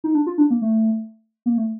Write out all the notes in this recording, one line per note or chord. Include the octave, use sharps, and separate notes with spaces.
D#4
D4
F4
D4
A#3
A3
A#3
A3